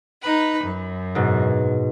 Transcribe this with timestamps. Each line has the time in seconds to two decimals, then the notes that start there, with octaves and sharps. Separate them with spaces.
0.21 D#4 B4
0.63 F#2
1.15 G#2 B2